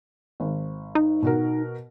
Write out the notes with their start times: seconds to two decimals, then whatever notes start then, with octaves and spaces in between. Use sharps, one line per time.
0.40 G#1
0.95 D#4
1.23 B2 F#4 A#4